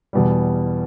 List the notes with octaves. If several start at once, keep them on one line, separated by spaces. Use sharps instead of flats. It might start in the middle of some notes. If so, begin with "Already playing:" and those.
E2 B2 G3